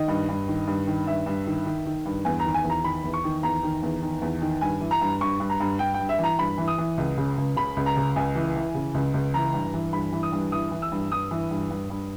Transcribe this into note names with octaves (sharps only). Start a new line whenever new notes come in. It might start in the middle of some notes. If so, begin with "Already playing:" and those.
Already playing: D#3 D#5
G2
G2
D#3
G2
D#3
G2 E5
G2
D#3
D#3
D#3
G2
E2 G#5
A#5
D#3
G#5
E2
A#5
D#3 B5
E2
C#6
D#3
E2 A#5
D#3
E2
D#3
E2
D#3
G2 G#5
E3
A#5
G2
G2 C#6
G2
A#5
G2
G2 G5
G5
G2
E5
E3 A#5
G2 B5
E3
D#6
E3
C#2
C#3
C#2
C#3 B5
C#2
A#5
C#3
C#2 G#5
E3
E3
C#3
C#2
C#2
E3 A#5
G2
E3
G2 B5
E3
D#6
G2
E3 D#6
E3
E6
G2
G2 D#6
E3
G2
G2
G2